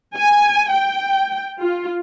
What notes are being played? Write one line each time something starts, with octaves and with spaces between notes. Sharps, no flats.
G#5
G5
F4